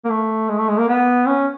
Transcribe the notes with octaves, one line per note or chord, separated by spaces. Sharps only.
A#3
A3
G#3
A3
G#3
A#3
B3
C#4